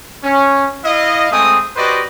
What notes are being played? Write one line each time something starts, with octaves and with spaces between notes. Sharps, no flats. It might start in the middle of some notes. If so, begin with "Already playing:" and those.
C#4
E4 D#5 F5
G#3 A3 C4 G#4 D#6
F#4 G4 B4 C5 D5 D#5